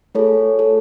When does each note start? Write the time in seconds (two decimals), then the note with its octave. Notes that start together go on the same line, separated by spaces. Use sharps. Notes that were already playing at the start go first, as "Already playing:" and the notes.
0.15 A3 F4 G#4 A4 C#5
0.59 A4